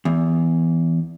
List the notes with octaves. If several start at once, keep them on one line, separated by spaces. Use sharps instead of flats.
E2